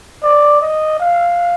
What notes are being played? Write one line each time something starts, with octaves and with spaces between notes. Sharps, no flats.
D5
D#5
F5